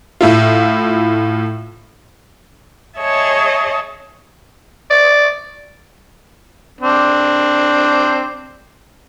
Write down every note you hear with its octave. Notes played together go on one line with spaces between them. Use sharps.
A2 E4 F4
G#4 C#5 D#5 E5 A5
D5
C4 D4